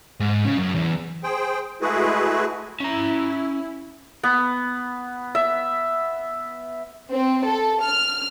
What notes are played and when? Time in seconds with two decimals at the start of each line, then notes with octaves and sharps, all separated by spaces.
0.20 G#2
0.45 C#3
0.58 F#2
0.75 E2
1.23 G#4 C5 G5
1.81 G#3 A3 E4 F#4 G#4 B4
2.80 C#4 E4 A#5
4.23 B3
5.35 E5
7.12 C4
7.46 A4
7.83 F6